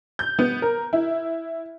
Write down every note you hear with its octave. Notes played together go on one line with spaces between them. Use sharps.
G6
B3
A#4
E4